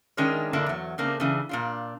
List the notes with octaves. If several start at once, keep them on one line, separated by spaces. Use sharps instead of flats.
D#3 G#3 C#4 D4 E4 A#4
G#2 D3 A#3 D4 E4 A5
E2 F#3
C#3 A3 A#3 C4 D4
C#3 E3 D4
A#2 D4 F4